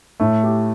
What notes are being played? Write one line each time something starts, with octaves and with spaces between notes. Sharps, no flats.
A2 A3
G4